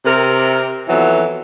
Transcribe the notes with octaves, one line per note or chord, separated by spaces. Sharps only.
C3 A#4
F2 E3 F#3 B3